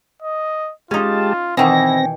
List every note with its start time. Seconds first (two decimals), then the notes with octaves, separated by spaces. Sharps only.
0.22 D#5
0.91 G#3 C#4 D#4 F4 G4 A5
1.57 B2 D#3 E3 C4 E4 G5 G#5 A#6